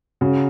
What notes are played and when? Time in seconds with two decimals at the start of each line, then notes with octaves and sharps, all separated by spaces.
0.21 C#3 F#4